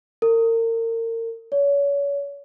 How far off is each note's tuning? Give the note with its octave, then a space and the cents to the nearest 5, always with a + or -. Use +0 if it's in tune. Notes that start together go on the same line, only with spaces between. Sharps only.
A#4 -35
C#5 +35